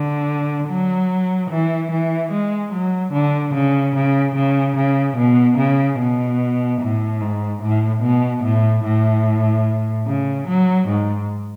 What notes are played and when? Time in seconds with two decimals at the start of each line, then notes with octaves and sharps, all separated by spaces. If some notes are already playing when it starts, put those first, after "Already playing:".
Already playing: D3
0.68 F#3
1.51 E3
1.91 E3
2.31 G#3
2.72 F#3
3.13 D3
3.54 C#3
3.95 C#3
4.36 C#3
4.76 C#3
5.17 B2
5.58 C#3
5.99 B2
6.81 A2
7.21 G#2
7.62 A2
8.03 B2
8.44 A2
8.84 A2
10.07 C#3
10.48 F#3
10.88 G#2